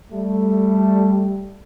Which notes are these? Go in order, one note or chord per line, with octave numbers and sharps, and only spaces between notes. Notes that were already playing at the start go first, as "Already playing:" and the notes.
G3 A3